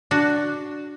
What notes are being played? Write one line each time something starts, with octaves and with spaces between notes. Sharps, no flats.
D4 F#4